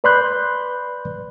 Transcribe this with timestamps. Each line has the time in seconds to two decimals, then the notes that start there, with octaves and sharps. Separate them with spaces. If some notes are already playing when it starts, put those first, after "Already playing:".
0.04 B4 D5 B5 C6 F#6 G6